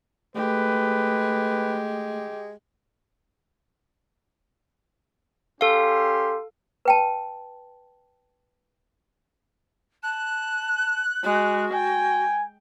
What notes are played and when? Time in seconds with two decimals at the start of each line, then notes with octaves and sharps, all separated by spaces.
0.36 G#3 A3 G4 B4
5.61 C#4 G4 A4 F5 C6
6.85 B4 G5 A5
10.03 A5 F#6
11.24 G#3 F#4
11.73 G5 G#5